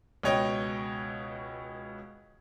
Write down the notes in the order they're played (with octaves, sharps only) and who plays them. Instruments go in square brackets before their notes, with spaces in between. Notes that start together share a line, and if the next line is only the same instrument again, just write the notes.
[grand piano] C#2 B2 C#5 D#5 G5